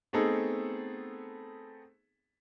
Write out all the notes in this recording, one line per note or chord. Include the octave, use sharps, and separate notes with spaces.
A3 B3 C4 D#4 G#4 A4